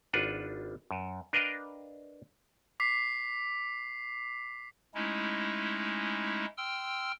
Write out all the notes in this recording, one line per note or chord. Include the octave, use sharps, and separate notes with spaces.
G#1 D4 F4 B4 F#5
F#2
D4 A#4 B4 D#5 F5 G5
D6 B6 C7
G#3 A3 C#4 D#4 E4
G5 C6 E6 F6